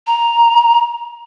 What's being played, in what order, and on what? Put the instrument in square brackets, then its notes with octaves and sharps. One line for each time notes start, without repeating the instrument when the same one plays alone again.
[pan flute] A#5